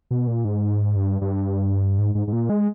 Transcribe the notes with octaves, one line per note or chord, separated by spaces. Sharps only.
B2
A#2
G#2
G2
G2
G#2
G#2
G#2
A#2
G#3